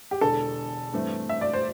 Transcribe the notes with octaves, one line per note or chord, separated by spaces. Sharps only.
G4
E1 E2 D3 A4
G2 E3 A3 C4
E5
D5
C5